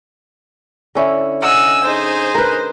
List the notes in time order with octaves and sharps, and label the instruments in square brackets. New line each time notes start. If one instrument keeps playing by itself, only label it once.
[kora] D3 C#4 E4
[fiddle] D#5 F#5 [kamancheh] G#5 E6
[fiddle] D#4 G#4 [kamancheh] C5
[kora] A#4 B4